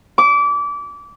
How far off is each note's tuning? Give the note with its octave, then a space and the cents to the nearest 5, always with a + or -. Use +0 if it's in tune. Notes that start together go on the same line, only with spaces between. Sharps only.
D6 -25